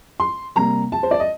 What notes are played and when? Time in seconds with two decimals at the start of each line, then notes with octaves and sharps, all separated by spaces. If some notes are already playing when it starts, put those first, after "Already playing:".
0.20 C6
0.56 C3 G3 A#3 A#5
0.92 A5
1.03 C5
1.11 D5
1.20 D#5